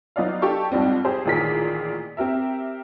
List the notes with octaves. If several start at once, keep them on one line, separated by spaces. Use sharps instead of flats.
F#3 B3 D#4 D5 F5
D4 G4 A4 A5 C#6
F2 G#2 G3 C4
G4 G#4 C5
A1 A#2 D#3 G#4 A#4 B6
C4 G4 A#4 E5